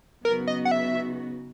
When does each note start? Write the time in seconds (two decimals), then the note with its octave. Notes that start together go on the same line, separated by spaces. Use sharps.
0.24 C#3 F#3 B3 D#4 F#4 A#4
0.47 D#5
0.65 F#5
0.71 E5